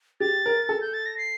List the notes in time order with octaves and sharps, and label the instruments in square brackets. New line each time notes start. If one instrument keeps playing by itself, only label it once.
[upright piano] G4 [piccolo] A6
[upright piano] A#4
A4
[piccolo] G6
A6
A#6
C7